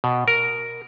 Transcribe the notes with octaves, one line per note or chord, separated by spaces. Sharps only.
B2
A#4